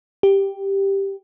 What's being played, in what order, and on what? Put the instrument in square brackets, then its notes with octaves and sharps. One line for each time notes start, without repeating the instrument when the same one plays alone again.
[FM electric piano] G4